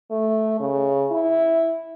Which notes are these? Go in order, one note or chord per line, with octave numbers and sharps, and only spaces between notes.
A3
C#3
E4